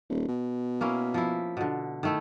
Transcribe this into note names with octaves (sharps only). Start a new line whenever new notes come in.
D#1
B2
A#3 C#4 E4
F3 E4
B2 D3
D#3 A3 E4